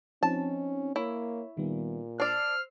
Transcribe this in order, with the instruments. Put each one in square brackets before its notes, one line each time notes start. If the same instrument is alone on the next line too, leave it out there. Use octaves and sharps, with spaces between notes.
[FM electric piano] F3 C4 D#4 [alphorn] C#4 [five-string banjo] A5
[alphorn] A#3 [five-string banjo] E4 [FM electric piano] C#5
[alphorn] A#2 [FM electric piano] D#3 G3 B3
[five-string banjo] D4 D5 [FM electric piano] C5 E6 C7 [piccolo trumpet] F6